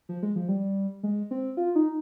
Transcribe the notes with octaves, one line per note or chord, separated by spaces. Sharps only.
F3
G#3
F3
G3
G#3
C4
F4
D#4